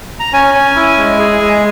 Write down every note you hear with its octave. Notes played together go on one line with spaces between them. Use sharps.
A#5
C#4 G#5
C#4
E4
G#3
G#4
G#3